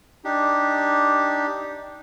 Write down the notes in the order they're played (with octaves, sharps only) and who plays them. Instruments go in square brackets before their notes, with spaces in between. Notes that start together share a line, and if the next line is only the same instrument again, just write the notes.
[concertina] D4 D#4 G4